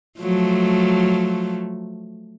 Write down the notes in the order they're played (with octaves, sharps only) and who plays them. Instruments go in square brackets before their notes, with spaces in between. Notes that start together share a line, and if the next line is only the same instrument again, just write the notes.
[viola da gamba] F3 F#3 A3